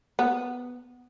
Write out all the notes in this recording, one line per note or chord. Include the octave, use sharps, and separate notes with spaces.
B3